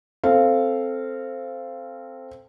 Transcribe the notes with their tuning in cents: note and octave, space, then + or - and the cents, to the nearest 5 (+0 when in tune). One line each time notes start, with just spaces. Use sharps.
C4 +0 A4 +0 F5 -15